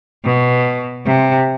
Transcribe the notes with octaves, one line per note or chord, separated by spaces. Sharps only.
B2
C3